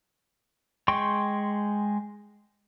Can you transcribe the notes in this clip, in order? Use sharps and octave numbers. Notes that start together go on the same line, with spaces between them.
G#3 G5 C6 C#6